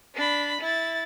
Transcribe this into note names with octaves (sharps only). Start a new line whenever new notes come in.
D4 B5
E4 A6